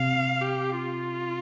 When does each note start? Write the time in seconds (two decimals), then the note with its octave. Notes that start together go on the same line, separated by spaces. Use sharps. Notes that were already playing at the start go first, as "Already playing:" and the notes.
Already playing: C3 F5
0.41 G4
0.75 F4